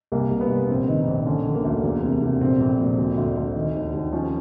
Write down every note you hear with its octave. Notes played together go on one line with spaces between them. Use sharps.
C2 A#3
C2
B3
C2
A#1 C4
D#3
D#4
A#1
D3 C#4
D3
A#3
D2
A3
E2 A#3
C3
C3
A#1 C4
A#1
A#2
D2
D2
D2
D#3
D#2
D#2
F3 C#4